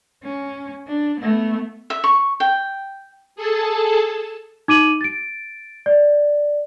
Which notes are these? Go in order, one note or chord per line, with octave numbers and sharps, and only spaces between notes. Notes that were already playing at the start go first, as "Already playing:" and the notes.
C#4
D4
A3 B3
E5
C#6
G5
G#4 A4 A5
D#4 D6 D#7 F#7
A6 D7
D5